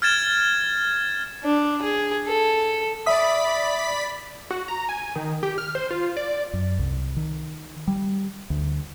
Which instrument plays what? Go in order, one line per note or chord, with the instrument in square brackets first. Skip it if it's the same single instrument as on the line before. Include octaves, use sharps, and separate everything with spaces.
[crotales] F6 G#6 A6 E7
[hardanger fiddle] D4
G#4
A4
[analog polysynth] D5 B5 B6 [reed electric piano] E5 D#6
[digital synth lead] F#4
A#5
G#5
D#3
G4
F6
C5
F4
D5
[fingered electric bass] F#2
C2
D#3
G3
D2